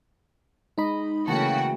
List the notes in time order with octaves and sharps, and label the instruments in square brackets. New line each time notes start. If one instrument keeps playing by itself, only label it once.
[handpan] G#3 D#5 [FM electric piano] D#4 B5
[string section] C#3 F#4 [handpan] E3 A3 A#3 [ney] G5 [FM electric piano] A5